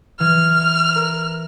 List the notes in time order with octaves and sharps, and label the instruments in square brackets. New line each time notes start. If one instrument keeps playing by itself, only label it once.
[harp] E3 [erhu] F6
[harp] A#4